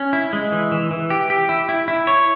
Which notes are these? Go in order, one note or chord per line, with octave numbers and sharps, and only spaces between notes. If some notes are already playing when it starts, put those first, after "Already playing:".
Already playing: C#4
E4
G#3
E3
E3
E3
G4
G4
E4
E4
E4
C#5